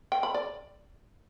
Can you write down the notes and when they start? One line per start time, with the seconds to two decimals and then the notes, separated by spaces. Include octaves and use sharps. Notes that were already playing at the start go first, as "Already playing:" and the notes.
0.12 G5
0.23 B5
0.34 D5